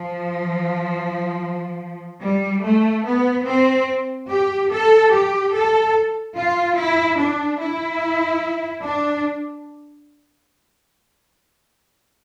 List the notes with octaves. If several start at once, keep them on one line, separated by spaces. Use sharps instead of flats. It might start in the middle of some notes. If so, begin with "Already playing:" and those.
Already playing: F3
G3
A3
B3
C4
G4
A4
G4
A4
F4
E4
D4
E4
D4